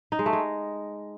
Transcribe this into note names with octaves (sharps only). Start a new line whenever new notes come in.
D#4
G#3
A3
G#3